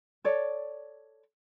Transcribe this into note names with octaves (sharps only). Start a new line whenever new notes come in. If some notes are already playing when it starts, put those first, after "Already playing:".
A4 C#5 D5